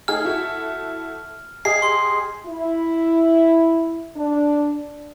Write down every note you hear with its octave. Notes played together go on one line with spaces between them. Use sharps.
A3 D#4 G#4 F6
E4 F#4 A4
G4 G#4 D#5 C7
C6
E4
D4